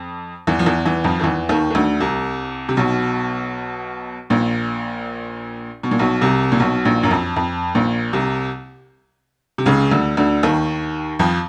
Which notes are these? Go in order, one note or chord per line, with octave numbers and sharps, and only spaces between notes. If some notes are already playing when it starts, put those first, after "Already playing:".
Already playing: F2
E2 E3
F3
E2 E3
E2 E3
F2 F3
D#3
E2 E3
D#2 D#3
D#3
D2 D3
C2 C3
C3
B1 B2
A#1 A#2
B2
A#2
B1 B2
C2 C3
A#2
B1 B2
A#1 A#2
F#2
F2
F2
A#1 A#2
C2 C3
C3
C#2 C#3
D2 D3
D2 D3
D#2 D#3
F2 F3